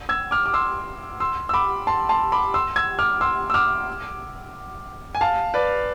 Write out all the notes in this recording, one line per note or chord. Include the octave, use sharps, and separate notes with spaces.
E6 G#6
D6 F6
D6
C6 E6
C6 E6
E6
B5 D6
A5 C6
A5 C6
B5 D6
C6 E6
E6 G#6
D6 F6
C6 E6
E6
D6 F6
G#5
F5 A5
B4 D5